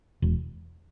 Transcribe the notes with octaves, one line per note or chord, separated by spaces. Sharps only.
E1